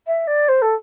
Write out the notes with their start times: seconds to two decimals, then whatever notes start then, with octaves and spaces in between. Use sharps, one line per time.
0.06 E5
0.27 D5
0.48 C5
0.62 A4